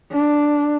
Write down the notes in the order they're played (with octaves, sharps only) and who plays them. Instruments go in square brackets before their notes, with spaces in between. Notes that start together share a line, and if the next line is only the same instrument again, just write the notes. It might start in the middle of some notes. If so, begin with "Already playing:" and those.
[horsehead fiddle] D4